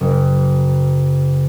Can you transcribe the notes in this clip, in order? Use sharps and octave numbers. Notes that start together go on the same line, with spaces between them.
F#1